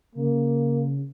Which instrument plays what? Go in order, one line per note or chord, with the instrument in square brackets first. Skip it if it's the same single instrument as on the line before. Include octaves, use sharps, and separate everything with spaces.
[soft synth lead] C#3 [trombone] A#3